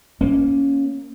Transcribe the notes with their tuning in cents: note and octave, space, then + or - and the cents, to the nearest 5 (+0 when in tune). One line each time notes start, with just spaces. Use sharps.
A#3 +5 C#4 +0